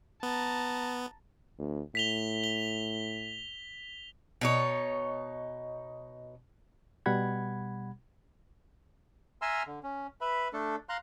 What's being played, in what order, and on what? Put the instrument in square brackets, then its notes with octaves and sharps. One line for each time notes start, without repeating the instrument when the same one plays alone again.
[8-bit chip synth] B3 [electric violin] A5 A#5
[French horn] D2
[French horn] A2 [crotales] B6 F7 G7
[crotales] G7
[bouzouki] B2 D#4 C#5
[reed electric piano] B2 G3 F#5 B5 G#6
[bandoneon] E5 G#5 A#5 C6 E6 F6
D3
C#4
B4 E5 B5
A3 D4 A4
F5 A#5 C6 F#6